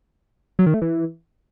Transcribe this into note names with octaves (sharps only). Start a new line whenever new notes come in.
F#3
D#3
A3
E3